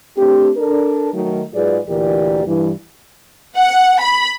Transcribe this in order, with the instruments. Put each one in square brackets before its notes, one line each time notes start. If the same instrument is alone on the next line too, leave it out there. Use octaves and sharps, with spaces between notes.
[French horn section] A3 C4 D4 G4
D4 A4 A#4
D#3 F#3 A3
G#2 F#3 F4 G#4 B4 D5
D2 A#2 E3 G4 A#4 D5
G2 E3
[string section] F#5
B5